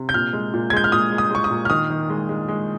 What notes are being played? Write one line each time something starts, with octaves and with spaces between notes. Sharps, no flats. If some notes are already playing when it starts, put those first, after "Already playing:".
Already playing: C3
G6
A#2 F6
G#3
A#2
G#6
G#3 G6
F6
A#2 D#6
G#3
D#6
G#3 C#6
D#6
A#2
F6
D#3 D#6
D#3
G#3
G#3
G#3